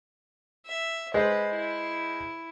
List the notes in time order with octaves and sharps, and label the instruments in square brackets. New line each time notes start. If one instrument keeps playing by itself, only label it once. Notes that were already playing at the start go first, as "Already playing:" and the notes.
[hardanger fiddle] E5
[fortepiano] G#3 C5 [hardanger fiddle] B4
[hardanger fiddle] E4